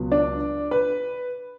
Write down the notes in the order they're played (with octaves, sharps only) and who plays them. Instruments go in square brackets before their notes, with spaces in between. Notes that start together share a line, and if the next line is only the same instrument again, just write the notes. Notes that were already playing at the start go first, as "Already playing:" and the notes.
Already playing: [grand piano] C#2 B2 F#3
D4 D5
B4